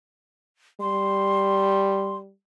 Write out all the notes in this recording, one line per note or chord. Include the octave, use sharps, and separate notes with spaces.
G3 C6